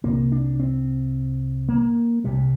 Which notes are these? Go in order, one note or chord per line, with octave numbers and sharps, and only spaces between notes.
C2 C3 A#3
D4
C4
A#3
C2 C3 G3